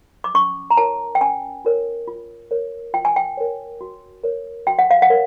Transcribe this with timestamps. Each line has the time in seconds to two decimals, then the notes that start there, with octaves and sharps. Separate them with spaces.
0.24 D6
0.34 C#4 C#6
0.70 A#5
0.77 F4 A#4 C#5 A5
1.15 G5
1.21 C#4 G#5
1.65 F4 A#4 C#5
2.07 F4
2.51 A#4 C#5
2.94 F4 G5
3.05 G#5
3.16 G5
3.37 A#4 C#5
3.81 F#4
4.24 A#4 C#5
4.67 F#4 G5
4.79 F#5
4.91 F5
5.02 F#5
5.10 A#4 C#5